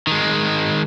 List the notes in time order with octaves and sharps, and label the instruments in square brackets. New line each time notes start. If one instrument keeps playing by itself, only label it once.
[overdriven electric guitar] D#3 G#3